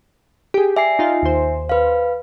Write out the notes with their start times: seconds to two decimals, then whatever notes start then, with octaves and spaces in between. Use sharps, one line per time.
0.54 G4 G#4
0.76 D5 E5 G#5 C7
0.99 D#4 F4
1.22 D#2 C5
1.69 B4 F5